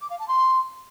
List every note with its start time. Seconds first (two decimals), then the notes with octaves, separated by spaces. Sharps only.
0.01 D6
0.10 F5
0.19 A5
0.28 C6